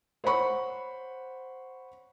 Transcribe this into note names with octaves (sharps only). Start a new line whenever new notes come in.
C5 C#5 F#5 B5 C#6